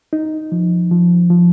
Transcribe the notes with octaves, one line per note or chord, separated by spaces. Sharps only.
D#4
F3
F3
F3